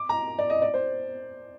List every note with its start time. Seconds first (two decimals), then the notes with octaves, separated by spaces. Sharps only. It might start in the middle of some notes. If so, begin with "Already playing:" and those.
Already playing: D6
0.09 A#5
0.39 D5
0.50 D#5
0.62 D5
0.74 C5